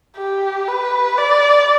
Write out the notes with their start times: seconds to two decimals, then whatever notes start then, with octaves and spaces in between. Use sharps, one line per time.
0.17 G4
0.68 B4
1.18 D5